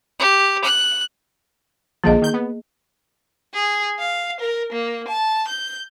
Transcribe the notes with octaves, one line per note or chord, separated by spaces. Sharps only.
G4
F#6
A#1 D3 F3 A#3 G#4 D#5
D#3 G6
B3
G#4
F5
A#4
A#3
A5
G6